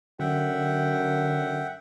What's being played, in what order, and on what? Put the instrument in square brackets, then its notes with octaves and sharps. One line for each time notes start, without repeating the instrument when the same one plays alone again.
[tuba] F#2 [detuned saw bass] D3 [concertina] E5 F#5 G5